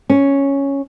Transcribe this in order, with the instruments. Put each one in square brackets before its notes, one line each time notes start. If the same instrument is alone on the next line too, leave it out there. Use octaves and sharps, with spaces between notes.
[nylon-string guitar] C#4